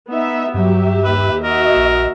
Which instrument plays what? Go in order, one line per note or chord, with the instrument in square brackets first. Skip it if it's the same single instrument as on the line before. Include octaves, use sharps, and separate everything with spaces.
[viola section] B3 D#4 E5
[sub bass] G2 [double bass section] F#3 [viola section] G4 E5
[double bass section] D#2 [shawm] B4
[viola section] F#4 D#5 E5 [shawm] A#4
[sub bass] A#1